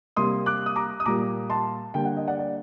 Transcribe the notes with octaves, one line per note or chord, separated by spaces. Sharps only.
C3 G3 A#3 C6 D#6
D6 F#6
D#6
A#5 D6
D#6
A#2 G3 A#3 A#5 D6
A5 C6
D3 G3 A#3 G5
F#5
D#5
D5 F#5
D5